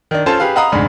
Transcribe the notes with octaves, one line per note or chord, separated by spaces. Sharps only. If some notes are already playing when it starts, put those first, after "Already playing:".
D#3 D4
C#4 F4 A4 C5 A5
G4 G#4 B4 F5
D#5 F5 F#5 A#5 B5 D#6
F1 D2 G#2 D4 B5